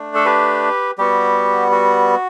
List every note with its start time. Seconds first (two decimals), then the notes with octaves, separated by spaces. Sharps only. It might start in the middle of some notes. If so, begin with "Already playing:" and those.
Already playing: A3 D4
0.15 A4
0.25 G4 B4
0.98 G3 B3 F#4 G4
1.72 F#4